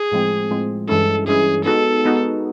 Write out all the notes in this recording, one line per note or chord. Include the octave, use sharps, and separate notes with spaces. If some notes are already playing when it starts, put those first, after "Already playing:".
Already playing: G#4
A2 F3 G#3 C4
A2 F3 G#3 C4
G2 E3 G#3 C#4 E4 A4
G2 E3 G#3 C#4 E4 G#4
G#3 B3 D#4 F#4 A4
G#3 B3 D#4 F#4